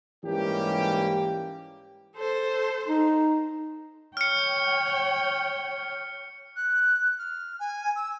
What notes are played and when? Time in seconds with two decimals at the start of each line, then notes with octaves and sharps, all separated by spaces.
0.25 G#2 E3 G3 A#3 C#4 G4
2.16 A4 C5
2.88 D#4
4.17 C#5 G5 F6 C#7
6.56 F#6
7.18 F6
7.59 G#5
7.95 E6